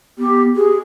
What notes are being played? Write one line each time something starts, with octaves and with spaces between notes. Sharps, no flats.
B3 G4
G4 G#4